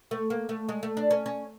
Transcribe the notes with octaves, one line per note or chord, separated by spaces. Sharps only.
A3
A#3
A3
G#3
A3
D4
C#4
C#4